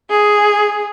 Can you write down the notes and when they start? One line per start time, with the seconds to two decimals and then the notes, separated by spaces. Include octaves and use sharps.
0.10 G#4